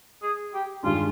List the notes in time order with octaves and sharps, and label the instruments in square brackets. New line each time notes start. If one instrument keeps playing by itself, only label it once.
[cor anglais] G#4
G4
[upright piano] G2 D#3 G#3 D4 [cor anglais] F4